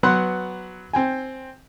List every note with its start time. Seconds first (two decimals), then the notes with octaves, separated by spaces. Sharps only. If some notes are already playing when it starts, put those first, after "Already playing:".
0.03 F#3 B3 B4 F#5 C6 F#6
0.93 C4 G5 G#5